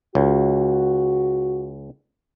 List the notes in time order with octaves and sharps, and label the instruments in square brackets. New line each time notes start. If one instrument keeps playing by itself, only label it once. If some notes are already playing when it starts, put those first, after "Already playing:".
[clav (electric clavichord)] C#2 [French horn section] F#4